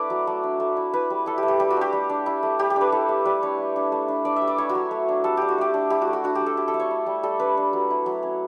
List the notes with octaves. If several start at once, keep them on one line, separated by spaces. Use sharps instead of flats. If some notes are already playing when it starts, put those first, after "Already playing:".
Already playing: A3 D4 E4 B4 D5
F#3
A3
D4
A3
E4
E4 B4
G3
E4 A4
G4
A3
G4
G3 G4
F#4
D4 G4
G3
D4
E4
A3
G3 G4
G4
D4 B4
E4 A4
A3
G3 B4
D4 C#5
G3
D4
A3
D4
D4 D5
E5
G3
D5
E4 C#5
F#4
F#3
A3
D4
G3 A4
D4 G4
F#4
A3 G4
D4
E4 G4
F#4
A3
F#4
D4 F#4
F#3 G4
A4
E4 G4
A4
A3
C#5
E4
G3
G3 A4
D4 B4
D4
F#3
E4
F#3
C#4